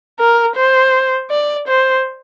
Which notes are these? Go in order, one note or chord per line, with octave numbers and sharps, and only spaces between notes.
A#4
C5
D5
C5